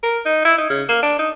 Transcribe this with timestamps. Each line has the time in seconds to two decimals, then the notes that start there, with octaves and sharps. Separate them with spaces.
0.03 A#4
0.26 D#4
0.45 E4
0.58 D#4
0.70 C#3
0.89 A#3
1.03 D4
1.19 D#4